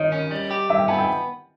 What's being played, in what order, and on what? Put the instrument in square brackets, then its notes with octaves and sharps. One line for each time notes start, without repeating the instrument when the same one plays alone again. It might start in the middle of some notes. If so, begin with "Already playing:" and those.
Already playing: [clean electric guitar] D#3 [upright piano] A#4 C#5 D#5
[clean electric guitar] C#4
G3
G4
[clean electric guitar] G2 [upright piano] E5
[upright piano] G5
[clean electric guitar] B3 [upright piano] G#5
[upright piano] G5